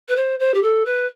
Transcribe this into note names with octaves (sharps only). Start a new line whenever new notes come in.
B4
C5
C5
G4
A4
B4